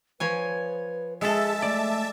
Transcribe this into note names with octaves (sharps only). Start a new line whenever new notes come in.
F3 B4 C#5 G#5
G#3 G#4 A4 E5 A5
A3 D5